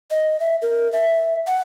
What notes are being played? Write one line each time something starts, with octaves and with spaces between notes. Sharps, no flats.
D#5
E5
A#4
E5
F#5